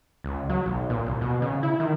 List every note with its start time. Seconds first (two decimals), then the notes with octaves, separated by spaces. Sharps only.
0.24 C#2
0.50 F#3
0.66 B1
0.90 A#2
1.06 C2
1.21 B2
1.42 C#3
1.63 E4
1.80 D#3